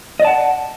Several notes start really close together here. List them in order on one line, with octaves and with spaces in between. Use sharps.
D#5 D5 A5 F#5